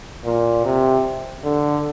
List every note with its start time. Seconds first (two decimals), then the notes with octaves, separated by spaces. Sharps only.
0.25 A#2
0.65 C3
1.44 D3